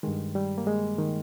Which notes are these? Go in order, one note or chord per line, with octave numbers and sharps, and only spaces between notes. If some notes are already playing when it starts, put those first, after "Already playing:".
G2 D#3 G#3
G3
A#3
G#3
D#3